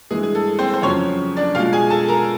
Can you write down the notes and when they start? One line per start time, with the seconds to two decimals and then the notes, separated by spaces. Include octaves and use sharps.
0.10 G2 E3 G#3 G#4
0.23 G#4
0.35 A4
0.59 C4 C5
0.74 C5
0.82 F2 C#3 F#3 C#4 C#5
1.37 D4 D5
1.55 B2 G#3 F4 F5
1.73 G#4 G#5
1.90 A4 A5
2.08 A#4 A#5